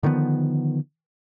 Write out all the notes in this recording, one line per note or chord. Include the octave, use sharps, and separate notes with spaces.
D3 D#3 F3 B3